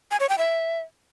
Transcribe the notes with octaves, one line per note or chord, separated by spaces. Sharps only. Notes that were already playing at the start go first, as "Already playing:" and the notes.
G#5
C#5
G5
E5